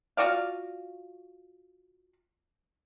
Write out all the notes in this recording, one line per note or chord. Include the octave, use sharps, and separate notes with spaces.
F4 F#4 D5 F5